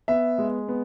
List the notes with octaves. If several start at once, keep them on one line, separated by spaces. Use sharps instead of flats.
B3 E5
G#3
B3